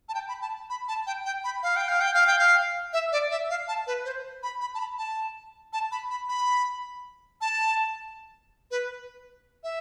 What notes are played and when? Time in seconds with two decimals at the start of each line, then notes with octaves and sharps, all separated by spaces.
0.09 A5
0.15 G5
0.28 B5
0.42 A5
0.70 B5
0.88 A5
1.07 G5
1.26 G5
1.44 B5
1.63 F5
1.76 G5
1.88 F5
2.01 G5
2.14 F5
2.27 G5
2.39 F5
2.93 E5
3.12 D5
3.31 E5
3.50 F5
3.68 A5
3.87 B4
4.05 C5
4.43 B5
4.61 B5
4.75 A5
4.79 B5
4.98 A5
5.73 A5
5.92 B5
6.10 B5
6.29 B5
7.41 A5
8.71 B4
9.63 E5